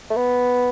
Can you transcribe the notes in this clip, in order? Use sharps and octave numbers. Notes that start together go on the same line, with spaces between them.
A3
B3